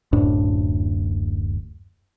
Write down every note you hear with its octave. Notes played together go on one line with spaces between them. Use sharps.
D1 F#2 A2 D4